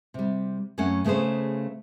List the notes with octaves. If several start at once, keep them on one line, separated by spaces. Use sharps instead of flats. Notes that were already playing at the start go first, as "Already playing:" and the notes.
C3 G3
F#2 F#3 A3 C#4 F#5
C#3 A3 B3 G#4 C5